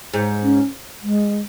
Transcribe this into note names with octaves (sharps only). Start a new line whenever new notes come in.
G#2
C#4
G#3